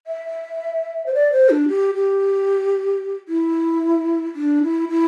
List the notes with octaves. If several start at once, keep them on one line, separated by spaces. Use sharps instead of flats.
E5
C5
D5
C5
D4
G4
G4
E4
D4
E4
E4